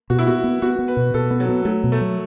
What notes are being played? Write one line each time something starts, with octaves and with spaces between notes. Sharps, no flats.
B2 F#4
E4
B3 F#4
B3
B3 F#4
B3
B4
B2
B2 A4
B3
F#3
B3
F#3 A3
B2
A3
F#3